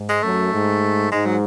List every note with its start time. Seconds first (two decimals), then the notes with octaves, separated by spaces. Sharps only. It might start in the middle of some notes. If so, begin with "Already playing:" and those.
Already playing: G#2
0.09 G#3
0.23 F#2 A3
0.53 G#2
1.12 G#2 G#3
1.26 F#3